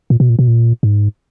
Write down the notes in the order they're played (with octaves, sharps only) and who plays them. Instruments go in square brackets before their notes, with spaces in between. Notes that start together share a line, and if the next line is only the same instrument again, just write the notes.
[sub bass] A#2
B2
A#2
B2
A#2
G#2